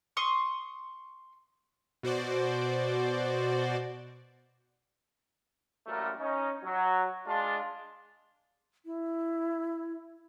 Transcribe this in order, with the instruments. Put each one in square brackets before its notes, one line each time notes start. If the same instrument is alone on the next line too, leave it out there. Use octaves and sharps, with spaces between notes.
[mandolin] C6 C#6 D#6
[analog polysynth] B2 F#4 C5 D5
[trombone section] A1 F#2 A#2 G3 A3 A#4
C#4 D#4
F#3
G#3 D4 F4
[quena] E4